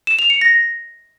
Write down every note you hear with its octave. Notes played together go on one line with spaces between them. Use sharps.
E7
F7
C#7
A#6